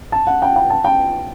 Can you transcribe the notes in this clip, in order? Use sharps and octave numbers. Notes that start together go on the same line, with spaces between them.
A5
F#5
G5
G5
A5
G5